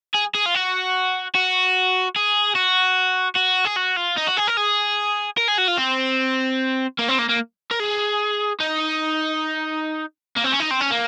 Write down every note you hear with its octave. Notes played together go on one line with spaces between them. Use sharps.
G#4
G#4
F4
F#4
F#4
G#4
F#4
F#4
G#4
F#4
F4
D#4
F#4
G#4
A#4
G#4
A#4
G#4
F#4
F4
C4
A#3
C4
A#3
A#3
A#4
G#4
D#4
A#3
C4
C#4
D#4
C4
C#4
A#3